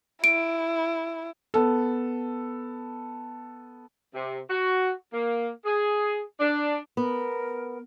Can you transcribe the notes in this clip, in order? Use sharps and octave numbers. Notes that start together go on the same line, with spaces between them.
E4 D7
B3 A4
C3
F#4
A#3
G#4
D4
B3 A#4